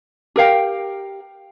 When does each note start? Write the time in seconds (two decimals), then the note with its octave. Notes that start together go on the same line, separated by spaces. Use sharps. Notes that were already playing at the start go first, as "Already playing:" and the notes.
0.36 G4 A#4 F5 G5